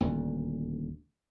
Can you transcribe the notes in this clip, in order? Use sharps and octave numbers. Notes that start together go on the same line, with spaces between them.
D#1 D2